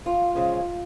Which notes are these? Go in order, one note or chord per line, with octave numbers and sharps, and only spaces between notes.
D#2 F4
C#3 F3 G#3 C#4